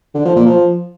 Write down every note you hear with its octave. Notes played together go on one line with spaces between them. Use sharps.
D3
F3
A#2
F3